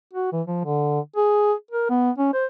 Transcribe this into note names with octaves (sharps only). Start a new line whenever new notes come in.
F#4
E3
F3
D3
G#4
A#4
B3
C#4
C5